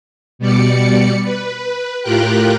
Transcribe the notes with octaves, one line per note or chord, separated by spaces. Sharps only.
B2 G3 D5 C#7
B4
A2 F4 G4 A#4 G5 F#6